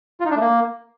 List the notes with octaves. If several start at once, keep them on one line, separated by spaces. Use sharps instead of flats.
F4
D#4
D4
A3
A#3